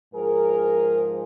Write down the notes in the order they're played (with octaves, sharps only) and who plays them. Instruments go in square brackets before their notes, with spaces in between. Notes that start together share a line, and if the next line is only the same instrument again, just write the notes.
[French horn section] G#2 F3 G#4 A#4